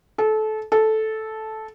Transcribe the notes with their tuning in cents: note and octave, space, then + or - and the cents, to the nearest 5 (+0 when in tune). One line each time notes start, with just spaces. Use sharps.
A4 -25
A4 -10